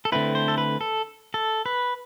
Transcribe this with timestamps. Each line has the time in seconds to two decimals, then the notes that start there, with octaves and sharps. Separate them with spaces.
0.05 A4
0.12 D3 A3 C4 E4 B4
0.35 C5
0.48 A4
0.58 B4
0.81 A4
1.34 A4
1.66 B4